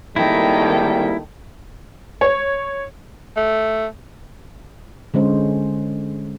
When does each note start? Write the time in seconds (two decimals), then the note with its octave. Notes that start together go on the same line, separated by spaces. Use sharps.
0.16 G#1 D#3 G3 A3 A#3 E4 G5
2.21 C#5
3.36 A3
5.14 D3 G#3 C#4 C5